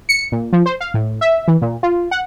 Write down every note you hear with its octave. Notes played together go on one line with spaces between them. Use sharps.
C#7
A#2
F3
C5
F5
A2
E5
E3
A#2
F4
F#5